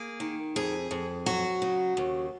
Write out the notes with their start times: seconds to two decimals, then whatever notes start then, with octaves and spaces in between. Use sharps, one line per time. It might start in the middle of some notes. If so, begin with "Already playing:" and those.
Already playing: A#3 G#4
0.20 D#3
0.56 F2 G#4
0.91 F2
1.26 F#3 F#4
1.62 C#3
1.97 D#2